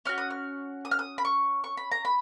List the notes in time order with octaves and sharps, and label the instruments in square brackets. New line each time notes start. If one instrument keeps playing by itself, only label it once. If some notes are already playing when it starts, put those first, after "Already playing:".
[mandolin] C#4 F#4 F6
D#6
F6
D#6
F6
D#6
B5
C#6
C#6
B5
A#5
B5